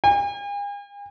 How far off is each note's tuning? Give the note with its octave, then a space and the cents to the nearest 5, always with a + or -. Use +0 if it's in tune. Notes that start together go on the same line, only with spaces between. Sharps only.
G#5 -45